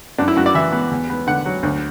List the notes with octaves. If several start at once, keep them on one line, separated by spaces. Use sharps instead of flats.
F#2 D4
E4
F#2 F#4
D5
E3 E5
B3
E2
B3
D3 F#5
F#3
D2